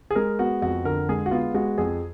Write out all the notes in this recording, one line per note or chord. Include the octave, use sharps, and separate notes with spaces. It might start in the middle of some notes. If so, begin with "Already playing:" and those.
G#4
G#3 A#4
B3 F#4
F2 F#4
D3 A#4
G#3 G#4
F#4
B3 F4
G#3 F#4
F2 G#4